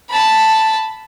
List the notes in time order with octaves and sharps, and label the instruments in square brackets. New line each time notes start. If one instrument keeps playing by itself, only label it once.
[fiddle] A5 B5